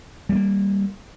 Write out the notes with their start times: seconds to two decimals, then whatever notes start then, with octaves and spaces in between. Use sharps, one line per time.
0.29 G3
0.32 G#3
0.35 A#3